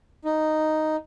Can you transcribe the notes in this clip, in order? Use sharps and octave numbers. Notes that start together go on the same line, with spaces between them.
D#4